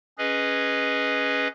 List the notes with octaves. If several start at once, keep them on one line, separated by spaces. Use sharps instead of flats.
C#4 G#4 B4 D#5